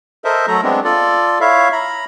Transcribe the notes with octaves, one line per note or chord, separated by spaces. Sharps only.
A4 A#4 C5 D#5 E5
F#3 A3 A4 A#5
G#3 B3 C4 D4
F4 A4 D5
E4 C#5 E5 F5
A#5 B5